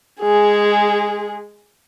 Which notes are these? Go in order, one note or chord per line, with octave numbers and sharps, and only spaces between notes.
G#3 G#4